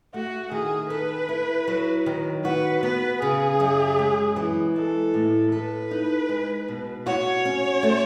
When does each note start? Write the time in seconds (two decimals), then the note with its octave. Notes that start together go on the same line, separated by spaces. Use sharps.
0.14 A3 F#4
0.51 D#3 G#4
0.90 A4 B4
1.29 E4
1.68 F#3
2.06 D#3
2.44 F#4 B4
2.83 B3 B4
3.21 C#3 G#4
3.60 F#2
3.99 G#3
4.36 E3
4.75 G#3 A4
5.14 A2
5.52 A4 B4
5.91 D#4
6.29 G#3
6.68 B2
7.06 F#4 C#5
7.45 C#4
7.83 A3